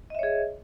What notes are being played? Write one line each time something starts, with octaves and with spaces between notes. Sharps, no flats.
G#4 C#5 D#5 E5